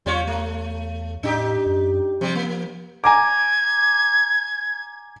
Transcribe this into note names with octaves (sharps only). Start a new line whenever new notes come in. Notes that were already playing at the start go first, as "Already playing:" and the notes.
E2 G3 F4 C#5
A3
A2 D4 D#4 G4
F#2
C3 F3 G3
A#3
G#5 A#5 D6 G#6